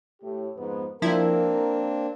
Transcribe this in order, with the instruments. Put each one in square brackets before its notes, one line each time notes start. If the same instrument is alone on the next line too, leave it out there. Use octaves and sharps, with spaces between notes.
[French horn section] A2 G4
F2 G#2 B3
[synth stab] F3 E4 [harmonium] A#3 C4 D4 [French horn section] A#4